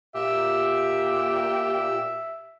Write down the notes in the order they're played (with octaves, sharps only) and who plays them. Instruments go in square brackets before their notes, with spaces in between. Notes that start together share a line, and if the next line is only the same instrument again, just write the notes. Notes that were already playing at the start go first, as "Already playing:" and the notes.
[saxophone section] A#2 G4 [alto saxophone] E5